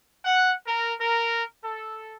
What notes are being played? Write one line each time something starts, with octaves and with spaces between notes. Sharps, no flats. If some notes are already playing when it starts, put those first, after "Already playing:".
F#5
A#4
A#4
A4